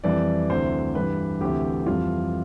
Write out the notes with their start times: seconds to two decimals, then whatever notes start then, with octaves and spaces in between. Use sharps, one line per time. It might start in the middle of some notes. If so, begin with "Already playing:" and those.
0.04 F2 E3 G3 D5
0.49 D2 C3 E3 C5
0.95 G2 E3 G3 B4
1.40 D2 C3 E3 G4
1.86 F2 E3 G3 F4